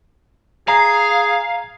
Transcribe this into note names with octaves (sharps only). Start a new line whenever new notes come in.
G#4 F5 A#5